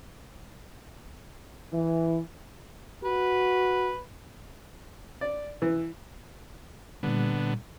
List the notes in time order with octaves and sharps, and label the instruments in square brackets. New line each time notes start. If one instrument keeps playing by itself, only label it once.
[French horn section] E3
[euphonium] F#4 [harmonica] B4
[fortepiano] D5
E3
[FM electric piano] A#2 G3 [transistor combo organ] D3 B3